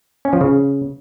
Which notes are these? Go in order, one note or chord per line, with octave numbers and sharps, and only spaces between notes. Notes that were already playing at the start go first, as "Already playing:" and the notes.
C#4
F3
C#3